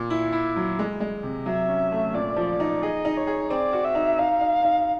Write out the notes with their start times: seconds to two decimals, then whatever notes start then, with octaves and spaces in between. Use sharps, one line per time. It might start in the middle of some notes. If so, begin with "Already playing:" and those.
Already playing: A#2
0.10 E4
0.32 E4
0.56 F#3
0.79 G#3
1.00 G#3
1.23 C3
1.46 F#3 E5
1.69 C#4
1.92 A3
2.14 A#2 D5
2.36 F3
2.60 D#4
2.82 G#4 D#5
3.05 D#4
3.17 C#5
3.27 G#4
3.50 C4 D5
3.73 F#4
3.84 E5
3.95 D#4
4.18 D#4 F5
4.41 D#4
4.63 D#4